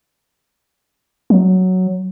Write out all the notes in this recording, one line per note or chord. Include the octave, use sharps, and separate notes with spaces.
F#3